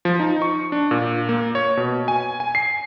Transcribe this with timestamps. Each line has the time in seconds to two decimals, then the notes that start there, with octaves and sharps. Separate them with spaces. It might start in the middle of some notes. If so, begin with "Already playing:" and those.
0.05 F3
0.20 D#4
0.42 C#6
0.72 D4
0.91 A#2
1.29 A#3
1.55 C#5
1.77 B2
2.08 G#5
2.40 G#5
2.55 C7